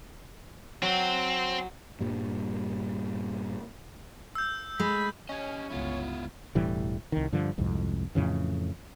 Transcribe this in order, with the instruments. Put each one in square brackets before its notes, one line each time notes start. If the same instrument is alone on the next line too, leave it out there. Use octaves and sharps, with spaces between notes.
[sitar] F#3 [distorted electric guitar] C4
[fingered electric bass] G2 A#2 G3
[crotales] E6 G6
[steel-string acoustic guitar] G#3 [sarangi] B5
[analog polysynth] C#4 [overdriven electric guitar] G4 D#5
[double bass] G1 C#2 [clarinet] B3 [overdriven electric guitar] E4 F4
[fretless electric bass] E1 A2 E3 G3
C2 D#3
G2 D3 F3
C2 F2 G#2
F2 A2 C#3 E3